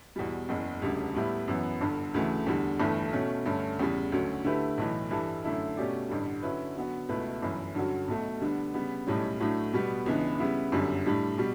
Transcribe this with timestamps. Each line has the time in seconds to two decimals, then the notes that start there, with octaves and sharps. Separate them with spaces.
0.16 E2 B2 G3
0.49 F#1 E2 C#3
0.82 E1 D2 C#3 G3 D4
1.14 A2 G3 B3 E4
1.48 F#2 E3 B3
1.81 G1 G2 D3
2.14 D2 C#3 E3 A3
2.46 E2 D3 G3 D4
2.80 G1 G2 E3 A3
3.13 B2 A3 C#4
3.45 G2 D3 A3 C#4
3.79 E2 C#3 G3
4.12 D2 D3 F#3 C#4
4.44 D3 A3 E4 G4 B4
4.78 B1 A2 E3
5.10 G2 E3 G3 D4 A4
5.44 F#2 D3 A3 E4
5.77 B2 A3 C#4 G4 D5
6.10 A1 G2 D3 G3
6.43 D3 F#3 C#4 E4 B4
6.76 D3 F#3 B3 F#4
7.09 C#2 B2 A3 E4 B4
7.42 G1 F#2 E3
7.75 G2 D3 F#3 C#4 F#4
8.08 B1 B2 A3
8.41 D3 G3 B3 D4
8.74 C#3 G3 B3
9.07 B1 A2 G3 C#4
9.40 A2 F#3 A3 D4
9.73 B2 G3 B3
10.06 C#2 C#3 E3 B3 D4
10.39 C#3 G3 B3 E4
10.72 G1 F#2 D3 G3
11.06 A2 G3 D4
11.38 B2 G3